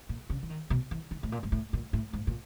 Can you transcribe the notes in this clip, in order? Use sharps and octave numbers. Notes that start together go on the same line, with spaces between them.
A#2
C#3
E3
D#3
B2
E3
D#3
A2
A#2
G#2
A2
A#2
A2
G#2
A#2